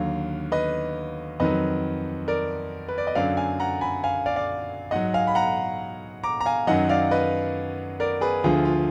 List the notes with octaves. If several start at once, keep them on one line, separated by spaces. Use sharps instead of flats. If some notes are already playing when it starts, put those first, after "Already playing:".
Already playing: D#2 D3 F#3 F5
B4 D#5
F2 D#3 F#3 B4 D#5
A#4 D5
B4
D5
D#5
F#2 D3 F#3 D5 F5
F5 G#5
F#5 A#5
G#5 B5
F5 G#5
D5 F5
D5 F5
G#2 F#3 D#5 F#5
F5 G#5
B5
F#5 A#5
A#5 D6
A#5
F5 G#5
F#2 D#3 F#3 D#5 F#5
D5 F5
B4 D#5
A#4 D5
G#4 B4
D2 D3 F3 F4 G#4
F4